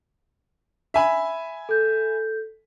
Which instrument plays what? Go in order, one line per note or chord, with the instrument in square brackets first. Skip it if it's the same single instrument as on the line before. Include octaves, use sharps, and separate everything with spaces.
[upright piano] E5 G#5 B5
[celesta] A4 G6